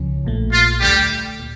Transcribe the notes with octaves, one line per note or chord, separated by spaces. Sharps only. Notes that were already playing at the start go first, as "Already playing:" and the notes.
Already playing: C#2 C#3 F3 C#4
A#1 A#2 A3
F4
D2 D3 G3 A3 G4
A#2